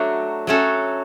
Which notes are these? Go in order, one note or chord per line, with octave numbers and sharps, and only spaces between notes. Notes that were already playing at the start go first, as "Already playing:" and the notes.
Already playing: F#3 A3 D4 F#4
F#3 A3 C#4 F#4 A4